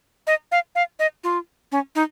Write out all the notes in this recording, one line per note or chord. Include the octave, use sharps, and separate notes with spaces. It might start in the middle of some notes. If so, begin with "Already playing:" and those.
D#5
F5
F5
D#5
F4
C#4
D#4